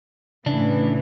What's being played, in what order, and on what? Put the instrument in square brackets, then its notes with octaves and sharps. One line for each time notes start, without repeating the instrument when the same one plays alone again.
[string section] A2 E3 [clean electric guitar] C#3 D4